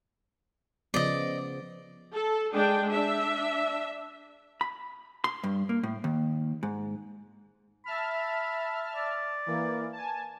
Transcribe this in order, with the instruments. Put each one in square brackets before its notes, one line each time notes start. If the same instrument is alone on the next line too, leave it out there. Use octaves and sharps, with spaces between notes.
[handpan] C#3 F3 B3 [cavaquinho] D5 D#5
[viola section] A4
G#3 D4 G#4 G5
D4 E5
[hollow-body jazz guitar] B5
C6
G2
A#3
A2
D#2
G#2
[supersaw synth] E5 A5 F6 [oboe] B5
[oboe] D5
[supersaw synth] E3 A#3
G#5 A5